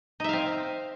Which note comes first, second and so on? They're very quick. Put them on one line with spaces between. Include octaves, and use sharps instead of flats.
D#4 E5 F5 C4